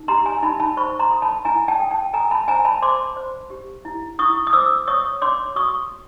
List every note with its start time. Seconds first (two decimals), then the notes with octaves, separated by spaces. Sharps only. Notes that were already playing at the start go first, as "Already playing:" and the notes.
Already playing: D#4
0.08 G4 A#5 C6
0.25 G#5 A#5
0.43 D#4 A5 B5
0.60 A5 B5
0.77 C5 B5 C#6
0.99 A#5 C6
1.11 A4
1.22 A5 B5
1.45 E4 G#5 A#5
1.68 G5 A5
1.80 A4
1.91 G5 A5
2.13 A4 G#5 A#5
2.31 A5 B5
2.48 C5 G#5 A#5
2.65 A5 B5
2.82 C5 C6 D6
3.16 C5
3.50 G4
3.85 E4
4.19 E4 C#6 D#6
4.47 D#6
4.53 C5 D6 E6
4.87 C#5 C#6 D#6
5.21 C#5 C6 D6
5.56 F#4 C#6 D#6